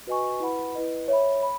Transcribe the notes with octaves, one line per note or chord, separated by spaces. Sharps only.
F#4 B4 D#5 G#5 C#6
E4 B4 F#5 B5
E4 B4 D#5
C#5 E5 B5
B5